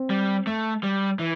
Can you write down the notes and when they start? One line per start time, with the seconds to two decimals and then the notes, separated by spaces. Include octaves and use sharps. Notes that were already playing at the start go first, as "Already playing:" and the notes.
Already playing: C4
0.10 G3
0.47 A3
0.83 G3
1.19 E3